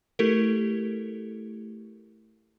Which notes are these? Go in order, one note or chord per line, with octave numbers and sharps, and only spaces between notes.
A3 E4 G4 A4 A#4